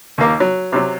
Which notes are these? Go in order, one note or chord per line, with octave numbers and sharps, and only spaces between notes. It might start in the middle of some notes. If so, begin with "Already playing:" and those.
D#2 A#3
F#3
C3 F#3